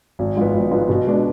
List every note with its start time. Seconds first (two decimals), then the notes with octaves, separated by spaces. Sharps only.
0.19 G#1
0.37 G#2 F3 B3
0.54 G#1
0.72 G#2 F3 B3
0.89 B2
1.07 G#3 B3 D4